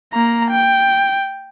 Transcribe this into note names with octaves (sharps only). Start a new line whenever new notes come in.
A#3 A#5
G5